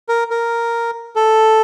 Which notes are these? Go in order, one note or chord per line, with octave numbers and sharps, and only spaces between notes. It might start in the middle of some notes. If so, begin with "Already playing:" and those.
A#4
A#4
A4